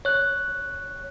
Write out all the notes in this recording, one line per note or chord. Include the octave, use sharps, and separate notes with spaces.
C#5 F#6